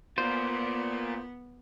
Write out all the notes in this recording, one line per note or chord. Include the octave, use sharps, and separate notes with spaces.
A#3 B3 F4 C5